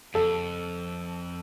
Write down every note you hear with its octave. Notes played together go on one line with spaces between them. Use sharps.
F2 A4